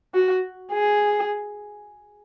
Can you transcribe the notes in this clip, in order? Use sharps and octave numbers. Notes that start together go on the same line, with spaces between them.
F#4
G#4